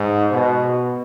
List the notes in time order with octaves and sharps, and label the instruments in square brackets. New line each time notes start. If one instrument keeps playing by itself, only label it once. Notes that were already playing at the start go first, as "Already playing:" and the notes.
Already playing: [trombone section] G#2
B2